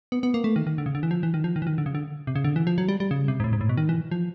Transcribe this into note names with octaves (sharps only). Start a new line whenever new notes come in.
B3
B3
A#3
A3
D#3
D#3
D3
C#3
D3
E3
F3
E3
D#3
F3
D#3
E3
D#3
D3
C#3
D3
C3
C#3
D3
E3
F3
F#3
G3
G3
C#3
C3
G#2
A2
G#2
A2
B2
D#3
E3
F3